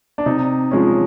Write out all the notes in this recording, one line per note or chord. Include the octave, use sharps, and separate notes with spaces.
D4
C3 D#4
F3 G#3 C#4